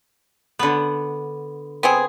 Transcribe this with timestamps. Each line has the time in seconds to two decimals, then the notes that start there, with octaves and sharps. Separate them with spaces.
0.59 D3 B3
1.83 B3 C4 G#4